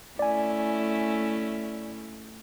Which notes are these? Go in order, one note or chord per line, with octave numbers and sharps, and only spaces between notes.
A3 C#4 E4 D5 G#5